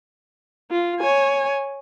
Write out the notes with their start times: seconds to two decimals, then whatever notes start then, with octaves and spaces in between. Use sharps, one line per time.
0.71 F4
1.00 C#5 G#5